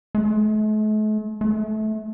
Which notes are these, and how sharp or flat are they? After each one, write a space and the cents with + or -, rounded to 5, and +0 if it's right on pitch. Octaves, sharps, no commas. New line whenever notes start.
A3 -45
A3 -25